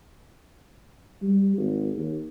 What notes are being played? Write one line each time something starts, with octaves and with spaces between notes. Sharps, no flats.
G3
G#1
D#2